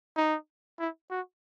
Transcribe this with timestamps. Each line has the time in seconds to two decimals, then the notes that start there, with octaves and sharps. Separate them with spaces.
0.17 D#4
0.79 E4
1.11 F#4